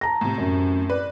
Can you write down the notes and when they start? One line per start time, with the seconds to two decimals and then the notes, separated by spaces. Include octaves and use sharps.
0.01 A5 A#5 A#6
0.21 A2 C3
0.38 F#2
0.90 B4 D5